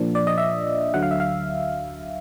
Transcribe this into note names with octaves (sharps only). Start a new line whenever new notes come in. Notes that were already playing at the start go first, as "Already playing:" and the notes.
Already playing: A#2 F3 A#3 D4
D5
D#5
E5
D2 D3 F#3 F#5
F5
E5
F5